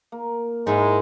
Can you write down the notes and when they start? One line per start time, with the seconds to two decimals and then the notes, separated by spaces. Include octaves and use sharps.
0.12 A#3
0.67 G#2 G#3 A#3 E4